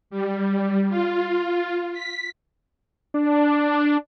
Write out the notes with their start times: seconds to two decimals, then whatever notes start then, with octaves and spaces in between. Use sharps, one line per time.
0.10 G3
0.89 F4
1.93 B6
3.14 D4